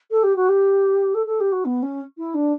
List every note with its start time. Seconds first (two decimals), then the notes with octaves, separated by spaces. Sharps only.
0.10 A4
0.23 G4
0.35 F#4
0.48 G4
1.14 A4
1.26 A4
1.40 G4
1.52 F#4
1.65 B3
1.82 C#4
2.17 E4
2.34 D4